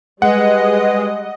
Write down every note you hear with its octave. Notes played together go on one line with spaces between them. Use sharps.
G3 G#3 B4 D#5 F#5